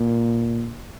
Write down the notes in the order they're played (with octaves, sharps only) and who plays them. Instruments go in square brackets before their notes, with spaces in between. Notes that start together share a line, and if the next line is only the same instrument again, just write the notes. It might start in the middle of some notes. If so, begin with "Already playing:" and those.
Already playing: [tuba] A#2